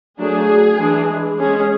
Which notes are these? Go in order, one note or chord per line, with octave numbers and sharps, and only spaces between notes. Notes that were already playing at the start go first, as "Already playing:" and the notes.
F#3 A3 D4 G#4
E3 G#3 D4
G#3 C#4 G#4